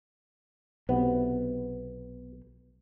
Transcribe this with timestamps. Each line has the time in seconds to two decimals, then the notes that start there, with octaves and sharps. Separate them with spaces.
0.89 B1 C3 B3